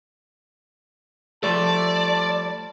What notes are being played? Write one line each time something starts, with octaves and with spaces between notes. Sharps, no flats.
F3 G3 A3 D5 A5